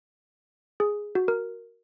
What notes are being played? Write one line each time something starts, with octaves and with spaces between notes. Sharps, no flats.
G#4
F#4
A#4